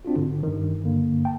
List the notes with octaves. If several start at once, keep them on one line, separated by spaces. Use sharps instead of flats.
C4 D4 F4 F#4
G#2 D3
G2 D#3
G2 D3 A#3
G5 A5